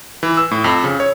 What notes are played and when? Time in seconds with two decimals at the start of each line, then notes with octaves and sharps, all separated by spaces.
0.23 E3
0.37 E6
0.51 A2
0.64 F2
0.84 C#3
1.00 C#5